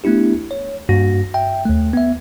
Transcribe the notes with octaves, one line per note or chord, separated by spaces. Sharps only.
A3 B3 D4 E4 G4
C#5
G2 A#3 F#4 A#6
E5 G5
D#2 A3
B3 E5